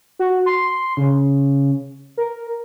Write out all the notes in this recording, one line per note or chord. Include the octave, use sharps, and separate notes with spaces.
F#4
C6
C#3
A#4